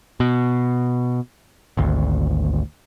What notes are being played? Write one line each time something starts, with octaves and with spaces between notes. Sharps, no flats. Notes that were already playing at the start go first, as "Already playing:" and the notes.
B2
G#1 D2